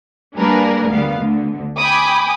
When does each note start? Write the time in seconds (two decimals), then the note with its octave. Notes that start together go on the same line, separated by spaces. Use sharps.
0.36 G3 A#3 D4 G#4 A#4 B4
0.89 D2 G3 B3 F5
1.20 D2 D3
1.79 G5 G#5 B5 D6 D#6